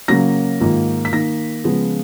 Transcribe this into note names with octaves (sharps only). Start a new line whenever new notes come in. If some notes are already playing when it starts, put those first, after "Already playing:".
C#3 F#3 A#3 A#6
G#2 D#3 A#3 F4
B6
D#3 A#3 D#4 A#6
C#3 F3 G#3 B3 F4